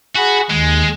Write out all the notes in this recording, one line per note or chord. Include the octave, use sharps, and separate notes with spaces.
F#4 G#4 F#5 B5
D#2 G#3